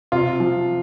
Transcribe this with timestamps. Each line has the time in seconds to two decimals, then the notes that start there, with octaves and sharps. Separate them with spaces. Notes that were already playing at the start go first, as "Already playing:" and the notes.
0.12 C3 F4
0.40 F3